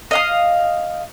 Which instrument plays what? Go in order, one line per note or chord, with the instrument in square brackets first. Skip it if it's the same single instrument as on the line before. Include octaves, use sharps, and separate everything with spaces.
[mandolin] D#5 F5 D#6